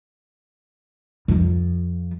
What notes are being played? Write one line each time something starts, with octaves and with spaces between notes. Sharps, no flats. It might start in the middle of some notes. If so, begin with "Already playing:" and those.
F2 F3